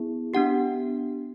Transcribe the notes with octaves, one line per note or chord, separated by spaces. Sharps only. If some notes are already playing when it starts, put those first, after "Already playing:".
Already playing: B3 E4 G#4
B3 D4 G4 F#5